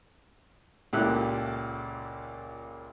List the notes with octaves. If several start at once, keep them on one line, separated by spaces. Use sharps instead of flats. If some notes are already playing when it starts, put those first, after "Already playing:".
C#2 A#2 E4 G4 A4 F#6